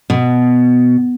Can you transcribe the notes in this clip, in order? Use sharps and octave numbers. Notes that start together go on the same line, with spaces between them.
B2